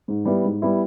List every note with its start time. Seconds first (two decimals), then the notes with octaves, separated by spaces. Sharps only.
0.08 G#2
0.25 G3 B3 E4
0.44 G#2
0.62 G3 B3 E4